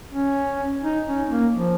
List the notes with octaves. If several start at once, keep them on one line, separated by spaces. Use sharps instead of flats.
C#4
D#4
C#4
A#3
F3